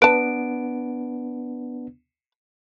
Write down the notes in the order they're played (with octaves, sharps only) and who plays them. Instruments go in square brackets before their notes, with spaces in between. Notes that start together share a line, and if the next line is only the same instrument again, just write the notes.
[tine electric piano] B3 D4 [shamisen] B4 A5 [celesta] D7